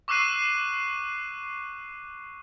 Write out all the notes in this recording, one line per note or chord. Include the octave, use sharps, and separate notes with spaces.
C#6 D6 E6 F#6 C7 D#7